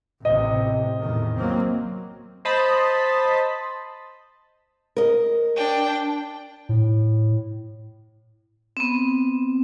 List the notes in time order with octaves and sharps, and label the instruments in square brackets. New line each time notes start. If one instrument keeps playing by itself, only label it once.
[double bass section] A1 C3 [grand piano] D#5
[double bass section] E2 A2 D#3
F#3 A#3 C4
[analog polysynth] C5 D#5 A5 B5
[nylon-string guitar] A#4 D#5
[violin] D4 G5
[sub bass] A2
[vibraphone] B3 C4